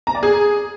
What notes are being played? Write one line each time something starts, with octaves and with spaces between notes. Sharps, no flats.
A#5
D5
G#4